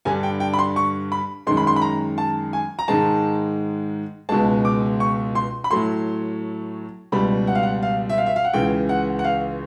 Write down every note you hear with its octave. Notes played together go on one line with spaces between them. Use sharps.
G2 D3 G3 G#5
G5
G5
B5
C6
C#6
B5
F#2 D#3 G#3 C6
B5
C6
B5
A#5
A5
G#5
A#5
G#2 D#3 G#3 A5
C#2 B2 G#3 A5
D6
C#6
C6
B5
A2 F#3 A3 C6
C#2 B2 G3 B5
F#5
F5
F#5
F5
E5
F5
E5
F5
F#5
C#2 C#3 E3 G5
F#5
F#5
F5